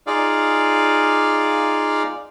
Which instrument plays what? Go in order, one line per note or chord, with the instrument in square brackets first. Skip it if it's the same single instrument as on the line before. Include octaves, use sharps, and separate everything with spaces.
[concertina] D#4 F4 G#4 D5 F5